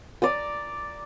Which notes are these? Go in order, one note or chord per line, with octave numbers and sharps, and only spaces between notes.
D5 A#5 D#6